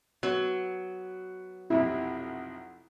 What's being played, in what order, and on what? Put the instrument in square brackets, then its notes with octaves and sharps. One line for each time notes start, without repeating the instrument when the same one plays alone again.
[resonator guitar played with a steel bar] F#3 [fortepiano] B3
[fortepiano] B1 F2 C3 [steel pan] E4